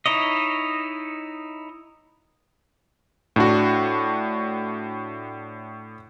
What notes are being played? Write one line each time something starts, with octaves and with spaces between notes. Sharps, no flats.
D#4 E4 C#5 D#5
A2 D4 F#4